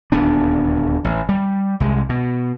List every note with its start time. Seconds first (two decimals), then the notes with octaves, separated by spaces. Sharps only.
0.12 D#1 D2 B3 D4
1.04 A1
1.29 G3
1.80 C2 G#3
2.09 B2